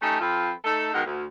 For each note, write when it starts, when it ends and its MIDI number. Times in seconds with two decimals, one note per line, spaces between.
0.01 0.20 57
0.01 0.20 61
0.01 0.20 63
0.01 0.20 67
0.01 0.20 69
0.20 0.51 53
0.20 0.51 60
0.20 0.51 65
0.20 0.51 69
0.20 0.51 71
0.65 0.91 57
0.65 0.91 63
0.65 0.91 69
0.93 1.04 47
0.93 1.04 51
0.93 1.04 56
0.93 1.04 70
0.93 1.04 78
1.05 1.24 38